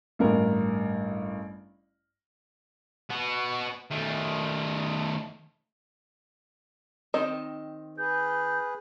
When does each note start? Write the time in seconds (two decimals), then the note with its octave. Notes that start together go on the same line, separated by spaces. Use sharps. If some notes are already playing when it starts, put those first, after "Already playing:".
0.19 A1 G2 A#4
3.10 B3 F#4
3.90 D#3 A3
7.14 D#3 C4 D#5
7.98 G#4 B4 G6